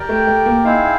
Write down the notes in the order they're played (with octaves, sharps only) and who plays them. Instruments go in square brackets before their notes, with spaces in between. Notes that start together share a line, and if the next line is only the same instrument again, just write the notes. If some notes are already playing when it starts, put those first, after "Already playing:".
Already playing: [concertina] G4 A#4 D5 G5
[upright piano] A3
A3
A#3
[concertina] C4 E4 G#4 C5 F5 [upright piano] D#4